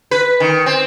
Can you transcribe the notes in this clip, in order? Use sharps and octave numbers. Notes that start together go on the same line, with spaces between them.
B4
D#3
C4